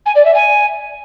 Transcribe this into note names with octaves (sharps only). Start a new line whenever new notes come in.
G#5
D5
E5
G#5